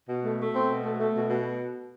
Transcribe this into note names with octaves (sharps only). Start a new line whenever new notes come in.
B2
A3
A3
B2 C4
B2
A3
A3
B2
B2